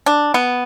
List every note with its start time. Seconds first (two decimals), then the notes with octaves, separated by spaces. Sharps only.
0.06 D4
0.34 B3